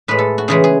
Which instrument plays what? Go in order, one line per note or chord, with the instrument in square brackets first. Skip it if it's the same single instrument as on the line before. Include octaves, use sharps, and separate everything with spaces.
[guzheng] A2 G#3 B4
A4
F#4
C#3 E3 G#3 G#4
G#4